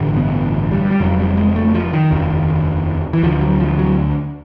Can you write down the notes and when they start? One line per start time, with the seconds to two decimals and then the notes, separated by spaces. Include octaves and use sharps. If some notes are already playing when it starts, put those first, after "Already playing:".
Already playing: A1 G2 D3
0.17 B3
0.72 G3
0.91 G3
1.00 F1 F2 C#3 F#3
1.18 G3
1.37 G#3
1.56 A3
1.74 F3
1.93 D#3
2.11 F1 D#2 C#3
3.13 E3
3.23 D2 D3 F3
3.41 F#3
3.60 F3
3.78 F#3